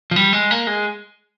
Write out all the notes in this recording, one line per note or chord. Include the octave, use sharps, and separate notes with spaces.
F3
G3
G#3
A#3
G#3